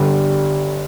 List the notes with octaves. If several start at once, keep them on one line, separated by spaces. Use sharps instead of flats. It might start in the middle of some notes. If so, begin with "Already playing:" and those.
Already playing: G1 G2 D3 G3